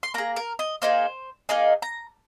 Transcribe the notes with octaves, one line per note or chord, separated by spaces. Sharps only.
C6
A#3 G#4 A#5
A#4
D#5
A#3 D#4 G#4 C5
A#3 D#4 G#4 D#5
A#5